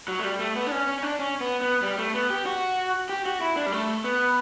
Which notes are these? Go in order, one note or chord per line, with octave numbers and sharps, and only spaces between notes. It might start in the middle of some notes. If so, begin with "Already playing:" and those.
F#3
A3
G3
A3
B3
D4
C#4
C#4
C#4
D4
C#4
B3
B3
G3
A3
B3
G4
F#4
G4
F#4
E4
D4
G3
A3
B3